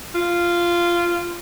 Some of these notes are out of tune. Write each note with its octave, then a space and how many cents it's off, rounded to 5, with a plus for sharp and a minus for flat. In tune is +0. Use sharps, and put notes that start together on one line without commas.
F4 -10